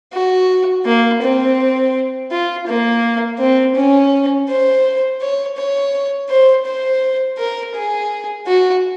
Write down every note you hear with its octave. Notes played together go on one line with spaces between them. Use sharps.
F#4
A#3
C4
F4
A#3
C4
C#4
C5
C#5
C#5
C5
C5
A#4
G#4
F#4